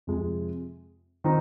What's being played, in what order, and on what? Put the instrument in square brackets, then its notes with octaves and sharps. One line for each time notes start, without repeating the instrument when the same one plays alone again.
[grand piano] F2 C3 G#3
D#3 C4 D#4